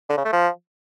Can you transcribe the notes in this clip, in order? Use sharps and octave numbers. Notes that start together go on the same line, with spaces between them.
D3
C#3
A3
F3